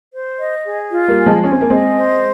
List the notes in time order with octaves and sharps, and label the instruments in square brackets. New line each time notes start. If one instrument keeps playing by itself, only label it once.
[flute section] C5
D#5
G#4
F4
[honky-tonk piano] G3 A#3
[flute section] G#5
[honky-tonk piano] F3 G#3
[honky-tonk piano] C#4 [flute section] G#5
[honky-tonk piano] C4
A#3
[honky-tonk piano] G#3 C4 [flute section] D#5
[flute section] C5